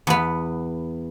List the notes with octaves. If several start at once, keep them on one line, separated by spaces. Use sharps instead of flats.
E2 B3